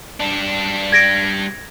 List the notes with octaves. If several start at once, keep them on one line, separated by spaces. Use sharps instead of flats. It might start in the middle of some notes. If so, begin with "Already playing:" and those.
G3 D4
G#6 A#6 D7